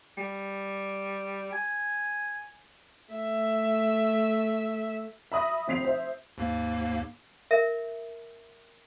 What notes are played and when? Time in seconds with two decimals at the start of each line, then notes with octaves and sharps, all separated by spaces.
0.18 G3
1.53 G#5
3.11 A3 E5
5.32 E5 B5 D#6 A#6
5.68 F1 C4 B6 C7 F7
5.85 C5 E5
6.38 D#2 G#2 A#3
7.51 A#4 E5